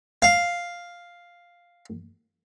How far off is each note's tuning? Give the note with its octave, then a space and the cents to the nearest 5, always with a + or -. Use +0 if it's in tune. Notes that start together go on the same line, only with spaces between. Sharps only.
F5 +0